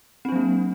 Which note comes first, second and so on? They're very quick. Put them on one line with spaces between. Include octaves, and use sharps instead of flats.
C4 D4 F#3 A#3